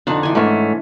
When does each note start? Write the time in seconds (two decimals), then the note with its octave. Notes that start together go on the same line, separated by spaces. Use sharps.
0.07 F2 D3 D4 D#4 B4
0.23 E3 G#5
0.35 G#2 A3 C#4